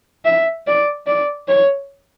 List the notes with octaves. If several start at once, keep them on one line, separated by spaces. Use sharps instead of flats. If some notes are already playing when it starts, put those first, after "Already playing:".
E5
D5
D5
C#5